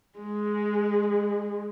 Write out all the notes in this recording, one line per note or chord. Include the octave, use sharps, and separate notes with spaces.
G#3